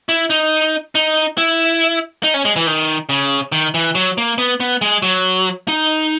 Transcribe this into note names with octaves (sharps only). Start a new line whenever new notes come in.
E4
D#4
D#4
E4
D#4
C#4
G#3
E3
D#3
C#3
D#3
E3
F#3
A#3
B3
B3
G#3
F#3
D#4